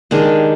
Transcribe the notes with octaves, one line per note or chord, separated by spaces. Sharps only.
D#3 G#3 D4 G4